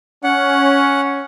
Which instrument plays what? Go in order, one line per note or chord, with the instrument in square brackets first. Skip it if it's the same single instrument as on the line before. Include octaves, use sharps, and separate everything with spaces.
[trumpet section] C#4 [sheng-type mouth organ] F#5